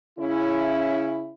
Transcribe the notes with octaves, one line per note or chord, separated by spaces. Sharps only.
C#3 C#4 E4